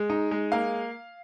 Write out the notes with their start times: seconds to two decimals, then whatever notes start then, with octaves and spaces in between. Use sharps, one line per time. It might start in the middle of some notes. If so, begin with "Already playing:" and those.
Already playing: G#3
0.10 D#4
0.31 G#3
0.52 A#3 F5